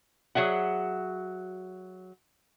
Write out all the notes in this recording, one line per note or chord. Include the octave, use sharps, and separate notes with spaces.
F#3 G#4 E5 F#5